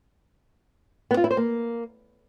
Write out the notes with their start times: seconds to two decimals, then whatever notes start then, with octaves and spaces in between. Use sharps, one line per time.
1.11 B3
1.17 F4
1.24 E4
1.31 C5
1.37 A#3